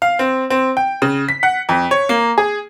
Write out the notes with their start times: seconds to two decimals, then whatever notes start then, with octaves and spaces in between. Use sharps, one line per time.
0.02 F5
0.19 C4
0.50 C4
0.77 G5
1.02 C#3
1.29 B6
1.43 F#5
1.69 F2
1.91 C#5
2.09 A#3
2.38 G#4